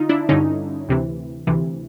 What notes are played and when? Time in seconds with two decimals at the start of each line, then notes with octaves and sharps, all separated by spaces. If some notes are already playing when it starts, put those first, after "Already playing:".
Already playing: D3 D#4 F4
0.09 D4 E4
0.29 G2 D3 C#4 D#4
0.88 D2 C3 E3
1.47 D2 C3 E3